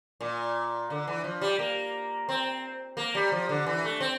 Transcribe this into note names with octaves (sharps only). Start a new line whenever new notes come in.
A#2
D3
E3
F3
G3
A#3
C4
A#3
G3
F3
D3
E3
A3
C4